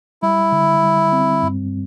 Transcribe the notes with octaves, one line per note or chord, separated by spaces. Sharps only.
G3 E4
D3
G3
C4
G2